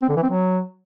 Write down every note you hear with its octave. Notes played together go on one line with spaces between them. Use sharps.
C4
D3
E3
C4
F#3